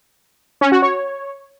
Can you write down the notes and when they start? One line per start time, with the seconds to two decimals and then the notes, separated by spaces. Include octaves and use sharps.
0.61 C#4
0.72 F#4
0.82 C#5